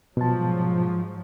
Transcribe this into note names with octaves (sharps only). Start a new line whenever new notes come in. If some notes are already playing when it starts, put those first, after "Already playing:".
G#2 B2 F3 F#3 A5